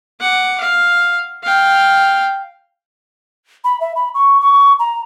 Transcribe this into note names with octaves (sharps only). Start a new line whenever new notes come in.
F#5 D6
F5
F5 G5
B5
E5
B5
C#6
C#6
A#5